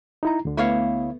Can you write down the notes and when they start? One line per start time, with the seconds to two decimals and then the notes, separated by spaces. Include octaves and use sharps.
0.23 D#4 E4 A#5
0.45 D2 D3
0.57 A3 B3 E4 C#5 F5